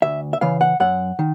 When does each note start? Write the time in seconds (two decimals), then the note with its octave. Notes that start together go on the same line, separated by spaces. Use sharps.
0.02 D2 E5
0.33 E5
0.41 C#3 E3 F5
0.61 F#5
0.80 F#2 F#5
1.19 D#3